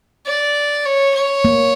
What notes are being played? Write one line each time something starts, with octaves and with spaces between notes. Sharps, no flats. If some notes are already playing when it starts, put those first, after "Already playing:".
D5
C#5
C#5
A#3